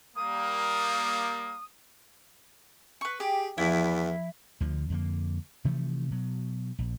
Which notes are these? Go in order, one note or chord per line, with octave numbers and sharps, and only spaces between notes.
G3 A#3 D#6
B4 C#6
G4 G#4
E2 F3 E4
D2 D3 F3
F2 D3 A#3
C3 E3 F3 A3
B2 F#3
A#1